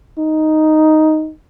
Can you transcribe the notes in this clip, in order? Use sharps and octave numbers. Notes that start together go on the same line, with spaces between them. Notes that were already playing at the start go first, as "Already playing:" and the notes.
D#4